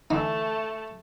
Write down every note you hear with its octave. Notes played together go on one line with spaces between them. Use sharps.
D3 E3 A3 D#4 A5